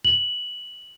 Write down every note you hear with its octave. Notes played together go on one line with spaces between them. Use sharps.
F#7